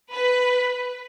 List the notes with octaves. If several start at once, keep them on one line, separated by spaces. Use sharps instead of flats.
B4